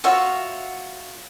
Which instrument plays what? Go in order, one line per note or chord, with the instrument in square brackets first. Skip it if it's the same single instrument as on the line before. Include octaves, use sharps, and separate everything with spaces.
[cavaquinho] F4 F#4 C#5 E5